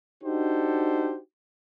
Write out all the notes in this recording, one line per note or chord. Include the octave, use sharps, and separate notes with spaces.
D4 D#4 F#4 G4 A4 C5